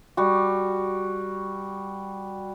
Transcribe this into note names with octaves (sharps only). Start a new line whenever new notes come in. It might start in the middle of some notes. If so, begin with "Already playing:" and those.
G3 F#4